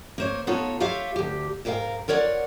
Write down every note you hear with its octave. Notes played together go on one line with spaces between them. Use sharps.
A#3 C5 C#5
B3 D#4 F4 A4 C#5
F4 G4 C#5 E5 F5
D2 G4
G#2 G4 A#4 D5 F5 G5
F4 A#4 C#5 D5 F#5